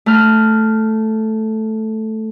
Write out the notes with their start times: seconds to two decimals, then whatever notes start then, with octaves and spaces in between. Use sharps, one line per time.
0.06 A3 F6